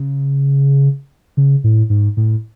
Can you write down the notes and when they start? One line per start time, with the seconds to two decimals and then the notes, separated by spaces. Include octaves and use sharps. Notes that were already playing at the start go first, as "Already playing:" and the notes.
Already playing: C#3
1.37 C#3
1.64 A2
1.90 G#2
2.17 A2